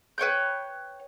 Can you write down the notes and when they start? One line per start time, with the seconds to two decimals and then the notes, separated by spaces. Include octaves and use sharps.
0.18 B4 C#5 G5 G6